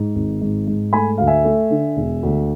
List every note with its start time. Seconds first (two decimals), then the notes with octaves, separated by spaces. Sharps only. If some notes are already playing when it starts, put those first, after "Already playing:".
Already playing: G#2
0.15 G#1
0.41 G#2
0.67 G#2
0.93 A3 G#5 B5
1.18 D2 F5
1.27 E5 G#5
1.45 A3
1.70 D3
1.97 E1
2.23 D2